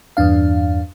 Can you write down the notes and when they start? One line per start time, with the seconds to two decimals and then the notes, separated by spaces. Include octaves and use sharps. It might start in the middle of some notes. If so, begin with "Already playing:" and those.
0.17 E2 G2 D4 F5